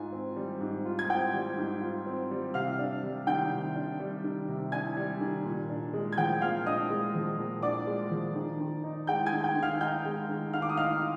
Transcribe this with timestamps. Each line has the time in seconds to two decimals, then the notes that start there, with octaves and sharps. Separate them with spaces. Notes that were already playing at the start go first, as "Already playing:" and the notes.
Already playing: G#2 F4 G#5
0.12 C4
0.36 G3
0.61 G#2
0.85 F4
0.99 G#6
1.10 C4 G5 G6
1.33 G3
1.57 G#2
1.81 F4
2.06 C4
2.31 G3
2.54 C3 F5 F6
2.79 D4
3.03 G3
3.27 D#3 G5 G6
3.52 C3
3.76 D4
4.00 G3
4.24 D#3
4.48 C3
4.72 D4 G#5 G#6
4.97 G3
5.20 D#3
5.45 A#2
5.70 D4
5.93 G#3
6.13 G#6
6.17 F3 G5 G6
6.41 A#2 F5 F6
6.66 D4 D#5 D#6
6.90 G#3
7.15 F3
7.38 A#2
7.62 D4 D5 D6
7.87 G#3
8.11 F3
8.35 D#3
8.60 D#3
8.84 D#4
9.07 G#3 G5 G6
9.26 G#5 G#6
9.32 D#3
9.44 G5 G6
9.56 D#3
9.62 F5 F6
9.81 D#4 G5 G6
10.05 G#3
10.29 D#3
10.53 D#3 F5 F6
10.62 D6
10.69 D#6
10.77 D#4 F5 F6